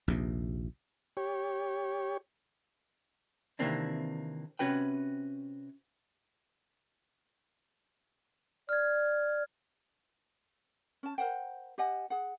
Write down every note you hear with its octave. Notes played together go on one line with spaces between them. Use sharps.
A#1 D#2 C3
G4 C#5
C3 D#3 E3 A#3 C4 D4
C3 C#4 F#4 B4 G5
D5 F6 G#6
C#4 A5
A#4 C5 F#5 G5
G4 D#5 F#5 G#5
G#4 F#5